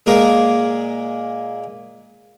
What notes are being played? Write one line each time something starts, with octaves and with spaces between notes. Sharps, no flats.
A#2 G#3 A#3 G#4 A#4 D#6